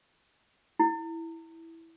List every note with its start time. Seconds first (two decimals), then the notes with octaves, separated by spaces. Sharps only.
0.79 E4